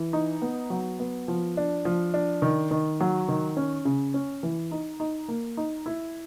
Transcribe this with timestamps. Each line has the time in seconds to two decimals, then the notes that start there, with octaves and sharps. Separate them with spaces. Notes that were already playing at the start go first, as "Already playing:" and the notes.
Already playing: E3
0.13 D#4
0.42 B3
0.70 F#3
0.99 B3
1.28 F3
1.57 D4
1.85 F3
2.14 D4
2.42 D#3
2.71 D#3
3.01 F#3
3.28 D#3
3.57 C#4
3.85 C#3
4.14 C#4
4.43 E3
4.72 D#4
5.00 D#4
5.28 A#3
5.57 D#4
5.86 E4